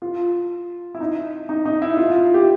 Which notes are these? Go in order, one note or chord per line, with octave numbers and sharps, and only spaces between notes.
F4
E4
D#4
D#4
D#4
E4
F4
F4
G4